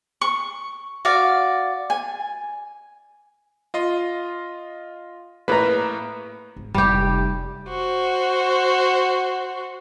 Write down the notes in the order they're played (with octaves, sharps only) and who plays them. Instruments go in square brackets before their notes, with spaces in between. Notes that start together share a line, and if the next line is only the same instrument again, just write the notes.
[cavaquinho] C#6
F#4 D5 F5
G#5
[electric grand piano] F4 D#5 C6
[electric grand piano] A2 A#3 [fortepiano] B4 A#5
[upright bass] G#1
[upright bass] F1 [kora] G3 G4
[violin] F#4 C5